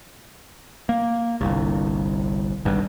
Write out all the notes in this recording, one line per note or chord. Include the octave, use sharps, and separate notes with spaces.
A#3
G1 C2
G#1 G2